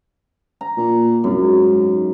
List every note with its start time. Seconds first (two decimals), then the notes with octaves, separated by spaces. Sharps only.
0.61 A#5
0.77 A#2
1.24 C2 F#2
1.41 G#2